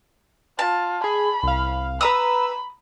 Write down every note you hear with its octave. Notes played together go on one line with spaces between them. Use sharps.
F4 A5
G#4 B5
C2 F5
B4 A#5 B5 D#6 E6